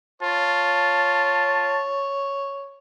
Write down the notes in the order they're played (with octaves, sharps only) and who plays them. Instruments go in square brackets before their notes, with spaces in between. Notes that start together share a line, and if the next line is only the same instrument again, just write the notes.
[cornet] F4 [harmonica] C#5 [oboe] A5